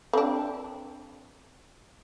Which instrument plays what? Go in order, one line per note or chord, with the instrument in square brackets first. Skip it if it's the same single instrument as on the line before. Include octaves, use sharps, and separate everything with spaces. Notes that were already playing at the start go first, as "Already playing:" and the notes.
[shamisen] C4 D4